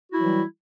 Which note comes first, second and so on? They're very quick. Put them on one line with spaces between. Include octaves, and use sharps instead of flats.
F#4 E4 F#3 E3 G3